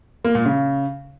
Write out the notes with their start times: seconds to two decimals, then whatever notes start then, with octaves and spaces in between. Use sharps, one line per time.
0.25 A#3
0.35 A#2
0.46 C#3